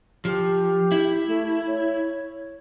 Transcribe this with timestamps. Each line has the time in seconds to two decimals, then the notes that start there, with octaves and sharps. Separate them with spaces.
0.25 F3 G4
0.92 E4
1.27 A3
1.67 C#5